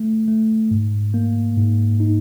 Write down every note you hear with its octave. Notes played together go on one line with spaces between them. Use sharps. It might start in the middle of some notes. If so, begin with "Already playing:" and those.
Already playing: A3
A3
G#2
A#3
G#2
D#4